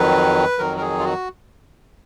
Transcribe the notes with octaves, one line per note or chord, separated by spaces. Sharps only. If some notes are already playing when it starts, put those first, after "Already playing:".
Already playing: F2 D#3 F#3 B4
F2 D#3 F#3 A#4
A#4
G#4
F4
F#4